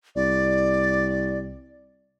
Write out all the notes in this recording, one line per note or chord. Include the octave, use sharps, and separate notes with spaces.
C2 D5